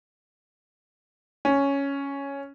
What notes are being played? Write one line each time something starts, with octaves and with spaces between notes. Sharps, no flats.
C#4